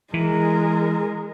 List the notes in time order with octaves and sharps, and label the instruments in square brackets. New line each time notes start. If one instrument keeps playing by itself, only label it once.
[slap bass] E3 [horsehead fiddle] G#3 A#4